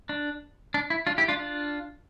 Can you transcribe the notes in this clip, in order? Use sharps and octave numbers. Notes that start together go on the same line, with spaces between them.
D4
D4
E4
D4 F4
E4 G4
D4 F4
D4 F4